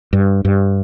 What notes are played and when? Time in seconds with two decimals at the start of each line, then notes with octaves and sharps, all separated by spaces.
0.13 G2
0.45 G2